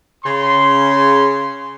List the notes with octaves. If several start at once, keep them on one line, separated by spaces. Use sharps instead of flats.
C#3 C6